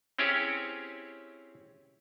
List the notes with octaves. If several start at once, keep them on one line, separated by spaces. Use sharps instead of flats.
C4 C#4 E4 G4 G#4 C#5